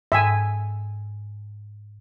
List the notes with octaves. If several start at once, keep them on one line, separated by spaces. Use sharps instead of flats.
G#2 E5 G5 G#5